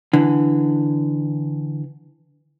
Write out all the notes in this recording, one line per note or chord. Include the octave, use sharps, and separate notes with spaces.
D3 E3